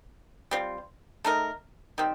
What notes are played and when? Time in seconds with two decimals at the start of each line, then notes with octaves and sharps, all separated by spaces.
0.51 G3 C4 F4
1.25 A3 D#4 A#4
1.98 D#3 G3 C4